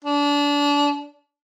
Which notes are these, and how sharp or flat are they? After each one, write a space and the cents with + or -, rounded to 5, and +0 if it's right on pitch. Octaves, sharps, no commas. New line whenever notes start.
D4 -30